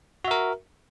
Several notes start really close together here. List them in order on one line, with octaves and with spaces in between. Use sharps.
F#4 E5 A#4